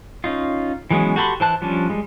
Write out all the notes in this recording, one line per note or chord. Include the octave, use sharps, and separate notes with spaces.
C#4 D#4 F4
E3 F#3 G#3 B3 C#4
F#4 G4 A4 B5 C6
E3 C5 A5 F#6
F3 G3 C#4 D4
G3 G#3